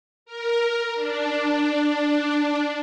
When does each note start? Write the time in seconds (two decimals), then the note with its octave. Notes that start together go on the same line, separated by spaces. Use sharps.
0.26 A#4
0.95 D4